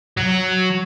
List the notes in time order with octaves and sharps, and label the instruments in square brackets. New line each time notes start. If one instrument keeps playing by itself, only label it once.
[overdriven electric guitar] F#3